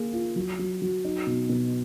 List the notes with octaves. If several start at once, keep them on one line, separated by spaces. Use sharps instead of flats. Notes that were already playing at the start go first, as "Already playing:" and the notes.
Already playing: A#3 G#4
F4
F#3
F#3
F#3
D#4
B2
B2